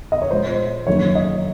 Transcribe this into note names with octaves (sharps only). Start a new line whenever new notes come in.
D#5
C#5
A#2 G#3 C5
F#2 D#3 A#3 C#5
D#5